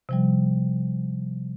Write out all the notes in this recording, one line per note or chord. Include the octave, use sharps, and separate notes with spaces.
C3 F3 G3